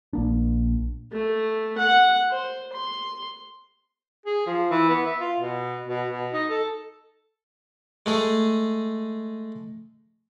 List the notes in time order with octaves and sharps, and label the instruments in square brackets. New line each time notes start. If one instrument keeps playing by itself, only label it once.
[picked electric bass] A#1 A#3 D4
[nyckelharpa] A3
F#5
C5
C6
[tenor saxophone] G#4
F3
E3
B3
E5
F4
B2
B2
B2
D#4
A4
[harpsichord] G#3 A3 G#4